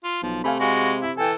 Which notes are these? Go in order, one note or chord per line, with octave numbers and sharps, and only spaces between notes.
F4
B1 F3
C3 A3 F5 G#5 B5
G#3 F#4
E4
E3 A4 G5 G#5